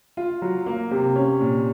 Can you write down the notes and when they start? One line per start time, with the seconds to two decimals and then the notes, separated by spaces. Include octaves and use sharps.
0.17 F4
0.42 F#3
0.66 A#3
0.91 C3
1.16 C#4
1.41 A#2